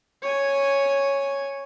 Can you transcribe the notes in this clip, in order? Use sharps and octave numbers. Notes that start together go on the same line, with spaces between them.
C#5 G#5